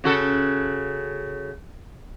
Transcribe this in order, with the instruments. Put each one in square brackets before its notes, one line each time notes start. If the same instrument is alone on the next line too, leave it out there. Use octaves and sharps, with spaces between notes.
[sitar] C#3 F#4 A4